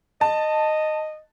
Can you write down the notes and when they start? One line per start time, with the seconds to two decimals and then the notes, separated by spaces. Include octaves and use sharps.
0.21 D#5 A5